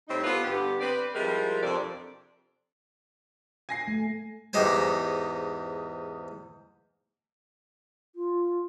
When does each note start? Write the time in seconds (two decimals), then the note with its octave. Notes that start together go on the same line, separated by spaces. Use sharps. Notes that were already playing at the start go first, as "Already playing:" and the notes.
0.08 A2 G3 C4 D#4
0.24 B3 F4 G4 A4 B4
0.44 G2 D3 B3 G4
0.81 C4 B4 D5
1.15 F3 G3 G#3 E4 A#4
1.63 F2 C3 F3 D4 A4 D5
3.69 G#5 A#6 C7
3.88 A3
4.53 E2 G#2 D#4 G4 C5 G#5
8.15 F4